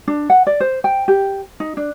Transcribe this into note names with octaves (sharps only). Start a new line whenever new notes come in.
D4
F#5
D5
C5
G5
G4
D#4
D4